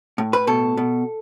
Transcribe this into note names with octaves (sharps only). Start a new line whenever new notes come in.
A2
B4
B2 A4
B2